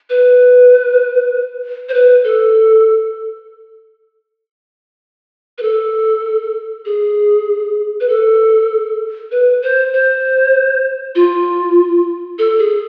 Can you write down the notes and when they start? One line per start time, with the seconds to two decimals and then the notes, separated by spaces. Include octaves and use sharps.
0.10 B4
1.89 C5
1.94 B4
2.24 A4
5.58 B4
5.62 A4
6.86 G#4
8.00 B4
8.09 A4
9.32 B4
9.62 C5
9.93 C5
11.15 F4
12.39 A4
12.59 G#4